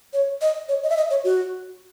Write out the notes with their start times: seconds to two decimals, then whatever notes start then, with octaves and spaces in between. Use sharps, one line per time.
0.13 C#5
0.42 D#5
0.69 C#5
0.83 D#5
0.90 E5
0.97 D#5
1.10 C#5
1.24 F#4